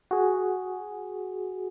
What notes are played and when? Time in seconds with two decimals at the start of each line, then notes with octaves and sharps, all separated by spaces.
0.11 F#4 G#4